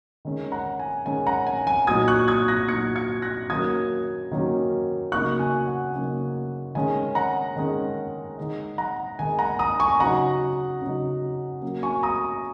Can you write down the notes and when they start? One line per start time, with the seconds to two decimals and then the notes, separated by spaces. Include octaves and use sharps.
0.25 D#3 G#3 C#4
0.52 F#5 A#5
0.79 G#5
1.06 D#3 G#3 C#4 G#5
1.26 F#5 A#5
1.47 G#5
1.67 G#5
1.87 A#2 F#3 D#4 D#6 G#6
2.08 C#6 F#6
2.28 D#6 G#6
2.48 F#6 A#6
2.68 A#2 F#3 D#4 G#6 C#7
2.96 G#6 C#7
3.22 F#6 A#6
3.50 D#3 F#3 A#3 C#4 D#6 G#6
4.32 D#3 F#3 A#3 C#4
5.12 C#3 F#3 A#3 D#4 C#6 F#6
5.39 G#5
5.67 F#5
5.94 C#3 F#3 A#3 D#4
6.75 D#3 G#3 C#4 G#5
7.15 F#5 A#5
7.56 D#3 G#3 C#4
8.38 D#3 G#3 D#4
8.78 F#5 A#5
9.19 D#3 G#3 D#4 G#5
9.39 F#5 A#5
9.59 A#5 D#6
9.80 G#5 C#6
10.00 C#3 F#3 D#4 F#5 A#5
10.81 C#3 F#3 D#4
11.62 F#3 A#3 C#4
11.83 G#5 C#6
12.03 A#5 D#6